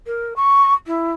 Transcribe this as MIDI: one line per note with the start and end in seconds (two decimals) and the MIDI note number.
0.06 0.33 70
0.36 0.73 85
0.86 1.13 64